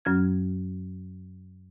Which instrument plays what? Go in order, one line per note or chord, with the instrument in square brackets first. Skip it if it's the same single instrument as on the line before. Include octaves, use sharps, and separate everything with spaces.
[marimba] F#2 F#3 C#4 F6 G#6